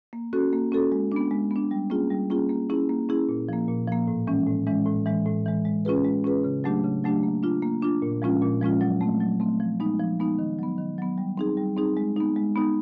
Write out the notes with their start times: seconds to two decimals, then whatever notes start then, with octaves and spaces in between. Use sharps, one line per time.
0.13 A#3
0.33 C#4 F#4 A4
0.53 A#3
0.72 C#4 F#4 A4
0.92 G#3
1.12 B3 D4
1.31 G#3
1.51 B3 D4
1.71 G3
1.90 A#3 C#4 F4 G#4
2.11 G3
2.30 A#3 C#4 F4 G#4
2.50 A#3
2.70 C#4 E4 G#4
2.89 A#3
3.09 C#4 E4 G#4
3.29 A#2
3.49 F3 A#3
3.68 A#2
3.88 F3 A#3
4.08 A2
4.27 E3 G#3 C#4
4.47 A2
4.67 E3 G#3 C#4
4.86 A2
5.06 E3 G#3
5.26 A2
5.46 E3 G#3
5.65 G#3
5.85 C#4 F4 G#4 B4
6.05 G#3
6.24 C#4 F4 G#4 B4
6.44 C#3
6.64 F#3 A3 D4 G4
6.84 C#3
7.04 F#3 A3 D4 G4
7.23 A#3
7.43 D4 F4
7.62 A#3
7.82 D4 F4
8.02 A#2
8.22 F3 G#3 C#4 F4
8.42 A#2
8.62 F3 G#3 C#4 F4
8.81 F#3
9.01 A3 C4
9.20 F#3
9.40 A3 C4
9.60 F3
9.80 G#3 B3 D#4
9.99 F3
10.19 G#3 B3 D#4
10.39 D#3
10.59 F#3 B3
10.78 D#3
10.98 F#3 B3
11.18 G3
11.38 C4 D#4 G#4
11.57 G3
11.77 C4 D#4 G#4
11.97 G#3
12.16 B3 D#4
12.36 G#3
12.56 B3 D#4